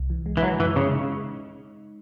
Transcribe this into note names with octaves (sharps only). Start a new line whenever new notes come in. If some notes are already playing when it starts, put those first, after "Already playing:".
Already playing: C2
E3
G#3
E3
F#3 G#3
F#2 E3
C#3 G#3
D#4